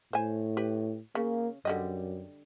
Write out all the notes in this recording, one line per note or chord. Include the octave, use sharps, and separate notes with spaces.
A2 C5 G#5
G4 B4
C#3 A#3
F#2 D3 G3 D#5